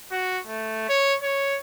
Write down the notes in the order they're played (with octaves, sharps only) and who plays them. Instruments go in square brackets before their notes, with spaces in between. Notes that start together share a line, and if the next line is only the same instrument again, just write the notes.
[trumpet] F#4
A3
C#5
C#5